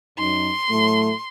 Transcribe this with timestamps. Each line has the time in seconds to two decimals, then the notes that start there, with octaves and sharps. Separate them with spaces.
0.18 F#2 D#4 C6
0.69 A2 F#3 A3